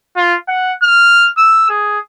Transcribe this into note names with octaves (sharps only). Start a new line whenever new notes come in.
F4
F#5
F6
E6
G#4